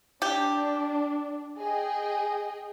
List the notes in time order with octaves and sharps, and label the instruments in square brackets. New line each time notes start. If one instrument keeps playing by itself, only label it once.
[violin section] D4 [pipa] G4
[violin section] G#4 D#5 G5